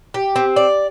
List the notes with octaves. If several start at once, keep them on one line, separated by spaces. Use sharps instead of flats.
G4
C4
D5